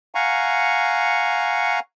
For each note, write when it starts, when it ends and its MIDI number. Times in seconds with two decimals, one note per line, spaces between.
0.15 1.79 77
0.15 1.79 78
0.15 1.79 80
0.15 1.79 82
0.15 1.79 85